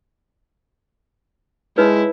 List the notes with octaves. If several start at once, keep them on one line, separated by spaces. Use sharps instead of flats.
G#3 D#4 E4 B4 C#5